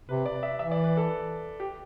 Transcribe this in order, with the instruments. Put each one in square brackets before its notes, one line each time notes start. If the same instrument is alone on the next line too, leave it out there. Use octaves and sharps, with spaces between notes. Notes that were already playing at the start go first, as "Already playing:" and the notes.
[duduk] C3 [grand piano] B4
[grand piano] D5
E5
[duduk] E3 [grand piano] E5
[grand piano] D5
B4
A4
G4